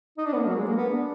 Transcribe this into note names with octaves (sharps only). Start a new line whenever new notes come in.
D#4
D4
B3
A#3
F#3
G#3
A#3
B3
D4